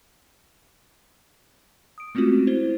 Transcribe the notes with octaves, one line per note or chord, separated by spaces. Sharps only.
D#6 D7
G#3 A3 C4 C#4 F4 F#4
E4 C5 G#6 G7